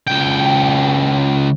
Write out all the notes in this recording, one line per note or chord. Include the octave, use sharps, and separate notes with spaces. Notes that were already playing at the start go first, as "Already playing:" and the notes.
C#2 G5